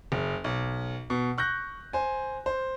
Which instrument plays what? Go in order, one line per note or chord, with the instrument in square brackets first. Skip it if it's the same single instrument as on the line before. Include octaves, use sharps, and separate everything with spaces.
[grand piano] F#1
B1
B2
C#6 F#6 G6 A#6
C5 G#5
C5